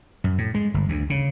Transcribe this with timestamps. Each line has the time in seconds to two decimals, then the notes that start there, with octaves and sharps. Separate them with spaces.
0.24 F#2
0.38 A2
0.54 G#3
0.74 G1
0.89 D2
1.10 C#3